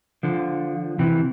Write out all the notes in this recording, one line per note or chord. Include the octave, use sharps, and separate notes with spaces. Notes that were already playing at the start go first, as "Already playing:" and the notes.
D3 F3
C3 E3